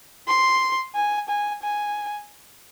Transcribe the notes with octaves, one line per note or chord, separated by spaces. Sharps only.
C6
G#5
G#5
G#5